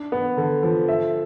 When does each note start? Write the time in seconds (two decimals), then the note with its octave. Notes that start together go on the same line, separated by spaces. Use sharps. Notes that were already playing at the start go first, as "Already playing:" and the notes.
Already playing: D4
0.12 B3
0.37 D3
0.63 F3
0.88 E5